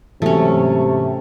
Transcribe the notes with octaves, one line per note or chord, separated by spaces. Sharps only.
G#2 C3 E3 F#3 A3 C#4